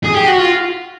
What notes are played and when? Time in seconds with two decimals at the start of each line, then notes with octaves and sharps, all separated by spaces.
0.05 G#4
0.16 G4
0.27 F#4
0.39 F4